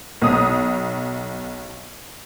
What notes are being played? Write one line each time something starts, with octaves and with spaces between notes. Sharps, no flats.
B1 D#6